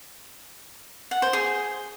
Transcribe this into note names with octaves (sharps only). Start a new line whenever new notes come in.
F#5
C5
G#4